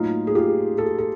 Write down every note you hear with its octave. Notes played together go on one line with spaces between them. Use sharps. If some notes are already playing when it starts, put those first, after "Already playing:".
Already playing: A2 F#3 A#3 D#4 F4
G#4
F4 G4
G4 A4
A4